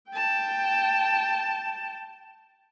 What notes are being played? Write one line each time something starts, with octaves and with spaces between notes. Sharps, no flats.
G5 A5